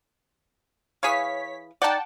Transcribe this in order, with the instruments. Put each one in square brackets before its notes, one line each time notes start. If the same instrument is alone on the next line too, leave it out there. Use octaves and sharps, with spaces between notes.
[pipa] E3 G#4 F5 [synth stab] C#5 B6
[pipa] D#4 D5 [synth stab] F#5 G5 A5